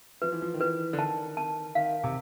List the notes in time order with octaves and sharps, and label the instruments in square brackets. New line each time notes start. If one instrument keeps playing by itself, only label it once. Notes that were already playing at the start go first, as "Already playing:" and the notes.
[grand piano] F3 [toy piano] B4
[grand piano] E3
F3
D#3
[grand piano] E3 [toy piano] B4
[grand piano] D3
[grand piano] D#3 [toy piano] A5
[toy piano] A5
[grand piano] D#3 [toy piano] F5
[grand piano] C3